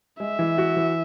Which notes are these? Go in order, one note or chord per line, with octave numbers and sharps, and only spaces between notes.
G#3 E5
E3
F#4
E3